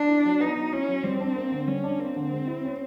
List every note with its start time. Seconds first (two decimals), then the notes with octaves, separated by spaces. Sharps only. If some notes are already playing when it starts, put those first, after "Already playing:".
Already playing: D4
0.08 E4
0.25 F#3
0.40 B3 D#4
0.56 F#3
0.72 C#4 E4
0.88 F#3
1.03 G3 C4
1.20 D4
1.36 A#3
1.52 D3
1.67 G3 C#4
1.84 D4
1.99 A#3 C4
2.16 D3
2.31 G#3
2.47 E4
2.64 C#4